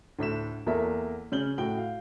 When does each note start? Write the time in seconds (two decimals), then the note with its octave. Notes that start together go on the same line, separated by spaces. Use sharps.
0.19 D2 A2 B6 E7
0.66 E2 A#3 A4 A#4 E5
1.32 C#3 C#4 G6 F#7 G7
1.58 A2 F#4 G5 G6 G7
1.78 F5